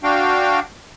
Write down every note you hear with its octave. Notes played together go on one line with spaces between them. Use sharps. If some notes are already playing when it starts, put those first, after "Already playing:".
D4 F#4 F5 G5